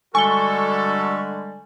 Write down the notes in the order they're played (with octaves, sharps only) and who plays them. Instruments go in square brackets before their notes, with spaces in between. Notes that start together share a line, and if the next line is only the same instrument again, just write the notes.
[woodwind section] D3 G3 G#3 [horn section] F#4 A4 [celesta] G#5 G7 [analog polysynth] C#6